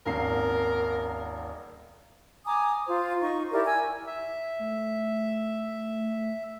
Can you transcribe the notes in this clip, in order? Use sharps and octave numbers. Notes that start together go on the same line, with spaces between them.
D#1 G#1 A#4 C7
G#5 A#5 D6 D#6
F4 C5
D#4 C#6
E4 G4 A#4 D5
G#5 E6
E5
A3